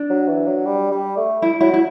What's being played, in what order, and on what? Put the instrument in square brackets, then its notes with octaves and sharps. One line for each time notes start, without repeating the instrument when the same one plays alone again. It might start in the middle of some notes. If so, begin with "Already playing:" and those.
Already playing: [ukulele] D4
[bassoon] F#3
E3
F#3
G3
G3
A3
[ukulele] E4
[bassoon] F#3 [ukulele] E4
[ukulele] E4